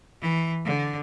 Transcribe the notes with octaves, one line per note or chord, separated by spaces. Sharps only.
E3
D3